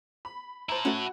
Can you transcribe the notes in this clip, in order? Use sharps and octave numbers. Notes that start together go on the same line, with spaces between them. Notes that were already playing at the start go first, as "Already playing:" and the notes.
B5
E4 C5 A5 A#5
A3 C#4 F#4